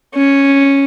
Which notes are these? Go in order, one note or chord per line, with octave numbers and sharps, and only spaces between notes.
C#4